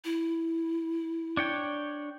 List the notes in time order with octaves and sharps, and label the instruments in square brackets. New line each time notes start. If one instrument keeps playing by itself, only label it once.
[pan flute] E4
[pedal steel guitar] D4 C#5 G5